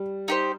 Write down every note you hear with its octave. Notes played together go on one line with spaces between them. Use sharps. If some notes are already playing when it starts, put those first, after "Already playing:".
Already playing: G3
D#4 G4 C5